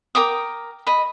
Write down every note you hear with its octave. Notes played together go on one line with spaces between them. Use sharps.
A#4 G5 D6 D#6
D#5 B5